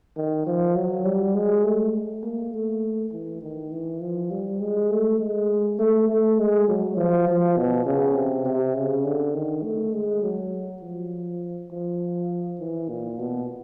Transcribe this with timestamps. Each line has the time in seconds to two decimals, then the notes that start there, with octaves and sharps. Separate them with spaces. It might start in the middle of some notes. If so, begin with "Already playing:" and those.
0.16 D#3
0.46 F3
0.76 F#3
1.05 G3
1.35 G#3
1.64 A3
2.23 A#3
2.53 A3
3.12 E3
3.42 D#3
3.72 E3
4.01 F3
4.31 G3
4.61 G#3
4.90 A3
5.19 G#3
5.79 A3
6.08 A3
6.38 G#3
6.68 F#3
6.97 F3
7.27 F3
7.57 B2
7.86 C#3
8.15 C3
8.45 C3
8.75 C#3
9.05 D3
9.34 D#3
9.63 A3
9.93 G#3
10.22 F#3
10.82 F3
11.71 F3
12.60 E3
12.89 A#2
13.19 B2